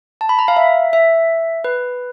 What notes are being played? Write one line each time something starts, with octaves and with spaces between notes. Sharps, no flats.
A5
B5
A#5
F5
E5
E5
B4